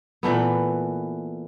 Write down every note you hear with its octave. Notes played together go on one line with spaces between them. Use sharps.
A#2 E3 A3 B3